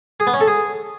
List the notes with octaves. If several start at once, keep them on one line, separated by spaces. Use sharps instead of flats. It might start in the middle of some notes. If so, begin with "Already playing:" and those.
G#4
B3
C#4
A4
G#4